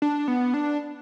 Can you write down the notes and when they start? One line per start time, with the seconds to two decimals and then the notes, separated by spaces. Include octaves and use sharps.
0.02 D4
0.28 B3
0.54 D4